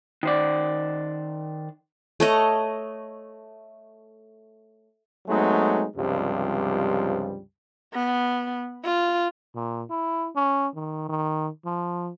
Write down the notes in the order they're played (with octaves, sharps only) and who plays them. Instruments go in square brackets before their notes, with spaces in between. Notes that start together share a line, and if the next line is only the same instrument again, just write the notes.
[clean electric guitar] D#3 C5 D5
[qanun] A3 C#5 D#5
[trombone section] F#3 G#3 A3 B3 C4 D#4
C#2 G2 C3 F3 G3
[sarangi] B3
F4
[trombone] A#2
E4
C#4
D#3
D#3
F3